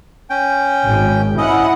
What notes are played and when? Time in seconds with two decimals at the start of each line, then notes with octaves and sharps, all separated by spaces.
0.30 C#4 G5
0.86 G#1
1.38 C#4 E4 D#5 F#5